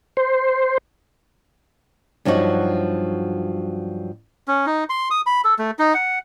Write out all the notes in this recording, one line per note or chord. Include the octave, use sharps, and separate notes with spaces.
C5
G2 F3 F#3 D#4 F#4
C#4
D#4
C6
D#6
B5
A4
A3
D#4
F#5